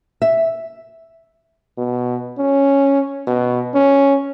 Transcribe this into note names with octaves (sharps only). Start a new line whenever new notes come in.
E5
B2
C#4
B2
C#4